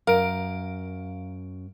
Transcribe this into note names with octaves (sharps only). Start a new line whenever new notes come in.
F#2 A#4 F5 D7